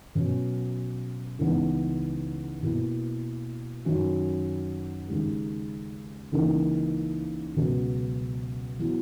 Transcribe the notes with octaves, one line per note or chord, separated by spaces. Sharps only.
B2 F#3 C#4
C#2 C#3 E3 B3 D#4
B2 A#3 E4
F#2 D#3 F#3 C#4
D#2 C#3 G#3
C#2 C#3 E3 A#3 D#4
C#2 B2 F#3
F#3 B3 E4